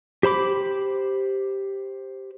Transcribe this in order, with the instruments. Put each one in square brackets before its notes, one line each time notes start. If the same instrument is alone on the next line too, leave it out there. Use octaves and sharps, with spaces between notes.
[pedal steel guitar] G4 C5 B5 D6